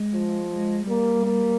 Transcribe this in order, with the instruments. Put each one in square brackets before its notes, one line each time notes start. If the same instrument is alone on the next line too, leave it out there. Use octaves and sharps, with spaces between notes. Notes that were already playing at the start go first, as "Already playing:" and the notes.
Already playing: [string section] G#3
[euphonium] F3
[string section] G#3
[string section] G3 [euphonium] A#3
[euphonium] A#3